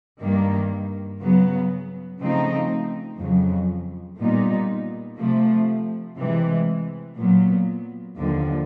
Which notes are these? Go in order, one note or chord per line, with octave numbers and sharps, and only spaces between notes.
G2 D#3 G3 A#3
C#3 F#3 B3
C#3 F3 A3 C4 D#4
F2 C#3 F#3
A#2 G3 B3 D#4
C3 F3 A3
C3 E3 G#3
A#2 F#3 B3
D#2 D3 F3